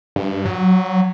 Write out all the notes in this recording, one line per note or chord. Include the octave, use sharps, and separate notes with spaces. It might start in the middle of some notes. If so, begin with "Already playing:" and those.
G2
F#3